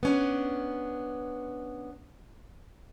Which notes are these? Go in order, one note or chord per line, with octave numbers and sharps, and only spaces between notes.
B3 C#4 D4